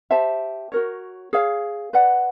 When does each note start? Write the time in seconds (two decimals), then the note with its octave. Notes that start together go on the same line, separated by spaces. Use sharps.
0.11 G4 C5 E5 A5
0.72 F#4 A#4 C#5
1.33 G#4 C#5 F5
1.93 B4 D5 F#5